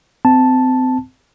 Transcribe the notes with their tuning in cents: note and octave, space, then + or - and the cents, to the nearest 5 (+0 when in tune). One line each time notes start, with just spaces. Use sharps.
C4 -30 A5 +0